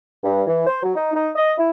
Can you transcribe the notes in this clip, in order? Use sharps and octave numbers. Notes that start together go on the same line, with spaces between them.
G2
E3
C5
F#3
D#4
D#4
D#5
E4